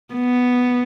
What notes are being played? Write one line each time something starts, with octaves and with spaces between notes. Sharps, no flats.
B3